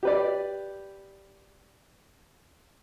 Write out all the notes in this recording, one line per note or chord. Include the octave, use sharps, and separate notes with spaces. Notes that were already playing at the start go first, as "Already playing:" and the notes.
G4 B4 D5